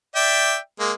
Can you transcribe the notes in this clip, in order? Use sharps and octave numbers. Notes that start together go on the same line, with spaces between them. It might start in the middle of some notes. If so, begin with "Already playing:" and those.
D5 E5 G5
G#3 A#3